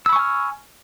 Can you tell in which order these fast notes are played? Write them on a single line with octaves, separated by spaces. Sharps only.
E6 B5 C#6 G#5 F6